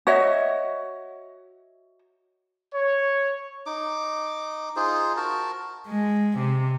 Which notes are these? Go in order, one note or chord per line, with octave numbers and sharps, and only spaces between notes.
F#4 C#5 D#5 E5
C#5
D#4 D6
D#4 F4 G#4 C5
F#4 A#4 A5
G#3
C3